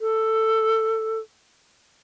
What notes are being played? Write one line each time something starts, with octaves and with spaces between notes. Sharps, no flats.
A4